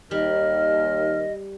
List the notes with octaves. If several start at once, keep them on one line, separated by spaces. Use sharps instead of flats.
D#2 G3 A#4 D#5 F6